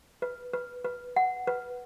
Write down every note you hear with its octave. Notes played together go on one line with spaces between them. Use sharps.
B4
B4
B4
F#5
B4